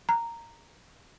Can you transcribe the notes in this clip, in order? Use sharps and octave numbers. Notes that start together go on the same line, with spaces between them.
A#5